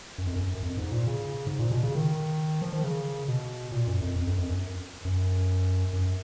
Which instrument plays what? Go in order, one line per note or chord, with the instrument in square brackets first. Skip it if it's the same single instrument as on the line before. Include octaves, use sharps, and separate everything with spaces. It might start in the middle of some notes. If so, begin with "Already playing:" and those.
[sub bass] F#2
F2
F#2
F#2
F2
G#2
A#2
C#3
G#2
A#2
B2
C#3
D#3
F3
D#3
C#3
B2
A#2
F#2
F2
F2
F#2
F2
F#2
F#2
F#2